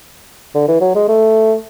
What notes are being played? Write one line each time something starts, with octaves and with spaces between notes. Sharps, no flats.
D3
E3
F#3
G#3
A3